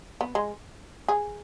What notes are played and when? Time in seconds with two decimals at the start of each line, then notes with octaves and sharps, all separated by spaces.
0.21 B3
0.35 G#3
1.08 G#4